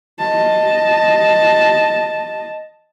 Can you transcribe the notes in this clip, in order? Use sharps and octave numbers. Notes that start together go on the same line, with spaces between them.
D#5 A5